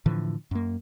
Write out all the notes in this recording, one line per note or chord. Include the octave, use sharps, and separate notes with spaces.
A2 D3 E3 F3
F#2 A#3